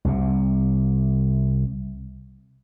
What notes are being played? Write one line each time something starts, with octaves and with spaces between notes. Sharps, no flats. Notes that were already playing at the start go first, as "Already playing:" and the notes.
C2 C3